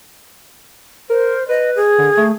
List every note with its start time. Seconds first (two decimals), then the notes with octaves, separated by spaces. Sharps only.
1.10 A#4 C5
1.49 B4 D#5
1.76 G#4
1.98 D3
2.17 A3